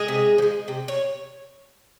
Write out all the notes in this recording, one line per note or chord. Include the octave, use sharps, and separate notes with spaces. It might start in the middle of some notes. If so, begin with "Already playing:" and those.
Already playing: G#3 G#4
C3
F3
G#3
C3
C#5